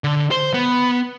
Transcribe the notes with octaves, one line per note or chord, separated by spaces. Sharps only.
D3
C5
B3